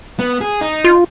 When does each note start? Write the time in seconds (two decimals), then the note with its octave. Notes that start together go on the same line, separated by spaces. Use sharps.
0.19 B3
0.41 G#4
0.61 D#4
0.84 F4